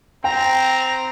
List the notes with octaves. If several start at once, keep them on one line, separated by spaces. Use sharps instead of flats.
C4 G5 A#5